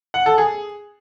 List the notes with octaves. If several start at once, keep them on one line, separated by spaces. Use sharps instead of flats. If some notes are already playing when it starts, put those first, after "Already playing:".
F#5
A4
G#4